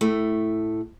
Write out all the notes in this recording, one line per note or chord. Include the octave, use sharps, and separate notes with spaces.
A2 A3